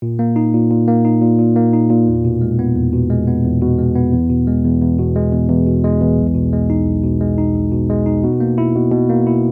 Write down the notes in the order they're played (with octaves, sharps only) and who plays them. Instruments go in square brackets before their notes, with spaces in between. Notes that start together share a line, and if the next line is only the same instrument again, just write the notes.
[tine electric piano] A#2
A#3
D#4
A#2
A#2
A#3
D#4
A#2
A#2
A#3
D#4
A#2
E2
B2
G#3
B3
E2
B2
G#3
B3
E2
B2
G#3
B3
E2
B2
G#3
E2
E2
B2
G#3
E2
E2
B2
G#3
E2
B1
B2
G#3
D#4
B1
B2
G#3
D#4
B1
B2
G#3
D#4
B2
A#3
E4
B2
B2
A#3
E4